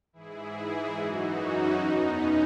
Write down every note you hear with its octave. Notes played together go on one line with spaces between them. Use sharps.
G#2 E3 E4 G#4
E4 G#4
F#2 E3 D#4 F#4
C#4
E2 B2 B3 D#4
C#4